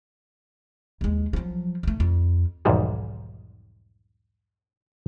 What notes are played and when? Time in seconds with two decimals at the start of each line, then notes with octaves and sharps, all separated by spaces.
1.01 D#2 G#3
1.33 F3 F#3
1.83 C#2 A3
2.00 F2
2.65 B1 E2 G#2 D#3 G3 G#3